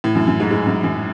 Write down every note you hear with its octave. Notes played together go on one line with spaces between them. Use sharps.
A2
F#2
F#2
G#2
G#2
F#2
F#2